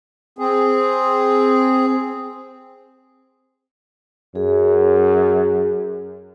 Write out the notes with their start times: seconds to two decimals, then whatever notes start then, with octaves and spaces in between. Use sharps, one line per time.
0.39 C4 G#4
4.35 F#2 G#4